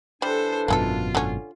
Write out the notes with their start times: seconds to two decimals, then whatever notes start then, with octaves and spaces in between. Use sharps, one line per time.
0.22 E3 G3 D4 A4 C5
0.68 G#1 F#2 B2 A#3 F4 G#4 A4
1.15 D3 C#4